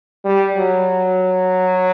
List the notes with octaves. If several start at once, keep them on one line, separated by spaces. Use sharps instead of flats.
G3
F#3